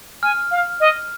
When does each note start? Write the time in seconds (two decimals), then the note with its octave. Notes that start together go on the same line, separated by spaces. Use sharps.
0.23 G#5 F6
0.51 F5
0.80 D#5